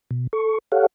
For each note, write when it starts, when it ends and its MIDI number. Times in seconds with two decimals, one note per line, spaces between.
0.11 0.27 47
0.33 0.58 69
0.33 0.58 85
0.72 0.86 67
0.72 0.86 69
0.72 0.86 73
0.72 0.86 77
0.72 0.86 78